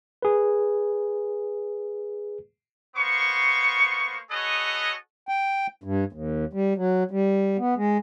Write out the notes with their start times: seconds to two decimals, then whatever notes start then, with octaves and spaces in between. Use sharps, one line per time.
0.22 G#4 B4
2.96 A#3 B3 C5 C#6
4.31 F#4 G#4 A4 B4 C#5 D#5
5.29 G5
5.84 G2
6.13 D#2
6.53 G3
6.77 F#3
7.11 G3
7.58 B3
7.77 G#3